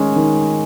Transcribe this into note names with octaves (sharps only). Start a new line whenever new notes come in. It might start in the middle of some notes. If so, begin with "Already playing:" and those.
Already playing: D#3 G#3 C#4
D#3